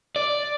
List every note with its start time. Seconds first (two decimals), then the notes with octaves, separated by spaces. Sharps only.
0.16 D5